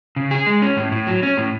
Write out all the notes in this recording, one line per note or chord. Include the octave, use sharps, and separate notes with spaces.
C#3
G#4
G#3
C#4
A2
A2
F#3
C#4
A2